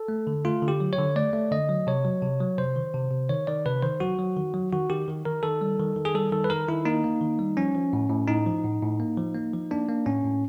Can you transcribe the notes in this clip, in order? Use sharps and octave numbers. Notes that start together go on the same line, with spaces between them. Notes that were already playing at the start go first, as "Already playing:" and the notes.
Already playing: A4
A3
D3
A3 F4
D3
G4
F#3
C#5
D3
A3 D5
A3
D3 D#5
F#3
C3 C#5
F#3
C3
F#3
C3 C5
D#3
C3
C3
D#3 C#5
D#3 D5
C3 B4
D#3 C5
F#3 F#4
F#3
D#3
F#3
D#3 F#4
D#3 G4
D#3
D#3 A#4
D#3 A4
G3
D#3
D#3
G#4
G3 A4
D#3 A4
B4
D#3 A#4
D#3 E4
A#3 D#4
A#3
D#3
G3
F3 C#4
F3
A2
A2
A2 D#4
F3
A2
A2
A#3
F3
A#3
F3
A#3 D4
A#3
A2 C#4
A2